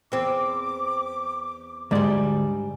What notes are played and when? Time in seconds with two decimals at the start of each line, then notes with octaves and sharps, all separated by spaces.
0.12 E2 C4 D6
1.91 D2 G#2 G3 G#3 D5